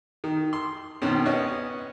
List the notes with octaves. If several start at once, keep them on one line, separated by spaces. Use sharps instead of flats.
D#3
C6
C#2 B2 D#3 C4 C#4
B3 C#4 C#5 D#5